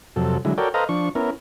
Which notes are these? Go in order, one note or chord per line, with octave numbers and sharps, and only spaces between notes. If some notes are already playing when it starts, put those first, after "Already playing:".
F2 C3 F#3 A4
D3 F#3 G#3 E4
F#4 A4 A#4 C#5 D5 G5
A4 B4 C5 D#5 F5 A#5
F3 D4 C#6
B3 C#4 E4 A#4